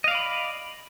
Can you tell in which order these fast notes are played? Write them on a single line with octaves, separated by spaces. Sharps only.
D#5 F5 D5 B5